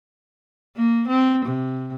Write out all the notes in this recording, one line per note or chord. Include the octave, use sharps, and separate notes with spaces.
A#3
C4
C3